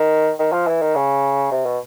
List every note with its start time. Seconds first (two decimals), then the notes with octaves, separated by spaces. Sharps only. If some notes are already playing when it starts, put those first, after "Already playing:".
Already playing: D#3
0.39 D#3
0.52 F3
0.67 E3
0.82 D#3
0.96 C#3
1.52 C3
1.66 B2